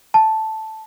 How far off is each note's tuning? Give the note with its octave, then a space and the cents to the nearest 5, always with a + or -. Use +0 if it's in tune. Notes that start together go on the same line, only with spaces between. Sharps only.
A5 -5